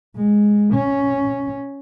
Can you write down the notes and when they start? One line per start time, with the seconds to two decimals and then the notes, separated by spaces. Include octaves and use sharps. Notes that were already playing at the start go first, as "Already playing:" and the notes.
0.16 G#3
0.73 C#4